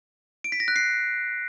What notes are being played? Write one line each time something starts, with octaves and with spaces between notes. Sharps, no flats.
D7
B6
A#6
F#6
C7